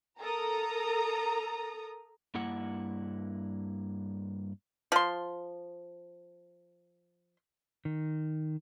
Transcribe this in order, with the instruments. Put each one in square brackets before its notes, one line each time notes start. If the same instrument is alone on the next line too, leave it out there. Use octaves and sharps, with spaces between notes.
[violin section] A4 A#4 D#6 [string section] A#5
[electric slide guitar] G2 A#3 E4 F#5
[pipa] F3 C6
[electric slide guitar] D#3